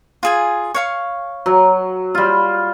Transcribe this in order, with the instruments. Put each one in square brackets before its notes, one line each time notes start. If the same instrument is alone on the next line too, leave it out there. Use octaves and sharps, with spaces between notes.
[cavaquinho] F4 G#4 G#5
C#5 F5 C#6
[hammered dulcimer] F#3
G3 F4